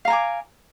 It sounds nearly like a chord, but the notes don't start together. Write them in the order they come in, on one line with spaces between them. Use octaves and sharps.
F5 A#5 G#5 D6